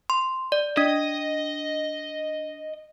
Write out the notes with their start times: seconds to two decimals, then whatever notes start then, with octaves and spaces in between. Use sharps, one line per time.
0.10 C6
0.52 D5
0.77 D4 D#5